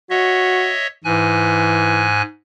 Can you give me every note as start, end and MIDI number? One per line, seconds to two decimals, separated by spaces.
0.10 0.73 66
0.10 0.87 73
0.10 0.87 75
0.10 0.87 76
1.04 2.22 44
1.04 2.09 52
1.04 2.22 80
1.04 2.22 90